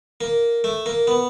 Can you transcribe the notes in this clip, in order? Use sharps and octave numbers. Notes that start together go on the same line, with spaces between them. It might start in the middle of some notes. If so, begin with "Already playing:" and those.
A#3
A3
A#3
B3